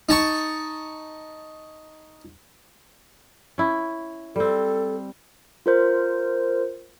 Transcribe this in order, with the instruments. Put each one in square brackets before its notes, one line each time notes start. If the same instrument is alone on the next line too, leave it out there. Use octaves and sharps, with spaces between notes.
[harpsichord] D#4 A5 C#6
[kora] C#4 E4
[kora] G3 C4 [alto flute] A4
[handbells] F4 A#4 C5